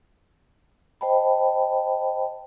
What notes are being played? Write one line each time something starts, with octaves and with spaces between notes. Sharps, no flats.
C5 D#5 G5 A5 B5